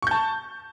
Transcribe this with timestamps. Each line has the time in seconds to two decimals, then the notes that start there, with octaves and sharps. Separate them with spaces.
0.02 C#6
0.07 G6
0.11 A5